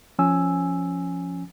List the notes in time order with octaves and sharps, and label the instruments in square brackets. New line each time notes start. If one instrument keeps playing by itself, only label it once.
[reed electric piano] F3 C#4 G#5 E6